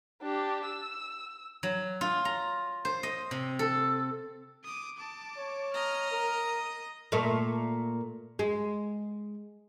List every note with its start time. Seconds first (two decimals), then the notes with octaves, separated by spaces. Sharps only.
0.22 D4 G4
0.65 E6
1.63 F#3
2.01 F4
2.25 A#5
2.85 C5
3.03 D#5
3.31 C3
3.59 A4
4.64 D6 D#6
4.97 A5 D6
5.37 C#5
5.74 D#5 A#5 F6
6.11 A#4
6.46 D#6
7.12 A#2 A3
8.39 G#3